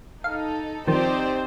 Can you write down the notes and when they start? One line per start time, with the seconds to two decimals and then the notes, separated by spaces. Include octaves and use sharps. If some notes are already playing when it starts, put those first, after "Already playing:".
0.24 D#4 A4 F5
0.87 D#3 F3 C4 D#4 G4 C5 D5